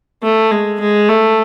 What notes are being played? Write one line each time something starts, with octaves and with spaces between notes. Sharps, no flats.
A3
G#3
G#3
A3